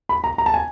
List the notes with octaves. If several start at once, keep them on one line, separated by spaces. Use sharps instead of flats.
B5
A#5
A#5
A5
G#5